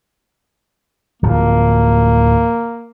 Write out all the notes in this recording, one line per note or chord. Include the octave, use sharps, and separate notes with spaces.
D1 F3 A#3